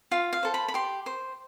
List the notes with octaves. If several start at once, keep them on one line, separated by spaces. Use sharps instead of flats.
F4 F5
F5
A4 C5
B5
B5
G4 C6
C5